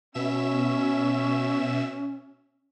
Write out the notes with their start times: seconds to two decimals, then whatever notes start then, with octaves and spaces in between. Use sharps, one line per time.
0.14 B2 C#4 E5 E7